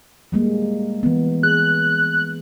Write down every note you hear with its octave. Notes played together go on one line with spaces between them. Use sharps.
G3 G#3 A#3
E3 B3
G#4 F#6